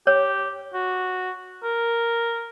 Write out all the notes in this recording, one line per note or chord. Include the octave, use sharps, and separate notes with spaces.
G4 C#5
F#4
A#4